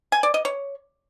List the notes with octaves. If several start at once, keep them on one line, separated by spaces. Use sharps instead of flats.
G#5
D5
D#5
C#5